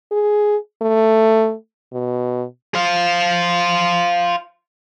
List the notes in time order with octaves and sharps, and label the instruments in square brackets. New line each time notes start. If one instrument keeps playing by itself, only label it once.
[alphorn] G#4
A3
B2
[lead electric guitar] C5 F5